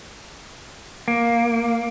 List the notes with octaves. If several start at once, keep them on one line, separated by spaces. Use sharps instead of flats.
A#3